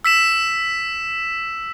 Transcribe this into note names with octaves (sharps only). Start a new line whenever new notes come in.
E6 B6 E7